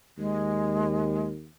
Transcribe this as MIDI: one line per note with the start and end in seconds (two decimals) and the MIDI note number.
0.18 1.50 39
0.18 1.28 56